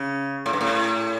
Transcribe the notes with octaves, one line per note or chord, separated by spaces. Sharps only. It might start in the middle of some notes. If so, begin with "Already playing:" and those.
Already playing: C#3
A2
G2
A2